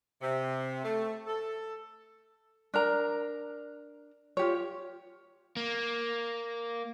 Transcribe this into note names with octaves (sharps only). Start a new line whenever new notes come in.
C3
A3
A4
D4 A#4 A#5
F4 G4 C#5
A#3